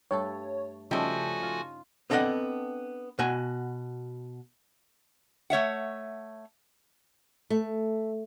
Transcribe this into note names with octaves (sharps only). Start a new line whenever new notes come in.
G2 A3 A4 C#5
C#3 F3 G3 A3 C#4 D#4 F#4 G#5
F4
B3 C4 D4 A4 D#5 F#5
B2 F#4 G#5
A3 C#5 E5 F#5
A3